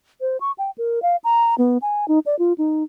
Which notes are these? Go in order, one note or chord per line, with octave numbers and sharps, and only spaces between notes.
C5
C#6
G5
A#4
F5
A#5
B3
G#5
D#4
D5
F4
D#4